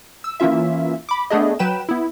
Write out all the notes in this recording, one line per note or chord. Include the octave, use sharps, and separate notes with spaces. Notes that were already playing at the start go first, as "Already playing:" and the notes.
E6
E3 A#3 C#4 F4 E5
B5 D6
A3 B3 D4 G#4 D#5
F#3 B4 G5 E7
B3 E4